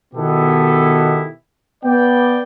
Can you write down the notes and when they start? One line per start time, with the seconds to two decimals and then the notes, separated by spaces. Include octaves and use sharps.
0.14 B2 D#3 B3 E4 G4 A4
1.84 B3 D5 G5